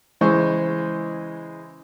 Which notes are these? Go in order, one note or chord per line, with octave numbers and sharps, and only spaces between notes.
C#3 E3 G#3 C5 C#6